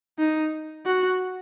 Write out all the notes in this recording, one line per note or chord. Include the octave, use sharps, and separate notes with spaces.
D#4
F#4